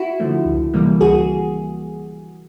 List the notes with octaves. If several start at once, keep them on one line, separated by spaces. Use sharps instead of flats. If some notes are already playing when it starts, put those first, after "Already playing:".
Already playing: E4 F#4
D3 F3 A3
C#2
C3 E3 G3 A#3
C#2 F#4 G#4